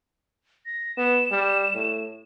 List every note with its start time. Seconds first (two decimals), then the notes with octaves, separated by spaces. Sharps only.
0.66 A#6
0.97 B3 E7
1.31 G3
1.75 A2